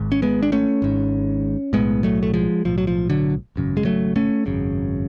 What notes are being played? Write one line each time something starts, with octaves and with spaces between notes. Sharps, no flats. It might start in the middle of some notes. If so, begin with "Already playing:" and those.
Already playing: G#1 G#2
C#4
G#3 B3
D4
A3 C#4
G#1 G#2
B1 A2 G#3 B3
F#3 A3
A3
F3 G#3
B1 A2 F3
F#3
F3
D3 F#3
G#1 F#2 C#3
G#3
F#3 A3
A3 C#4
G#1 F#2 C#3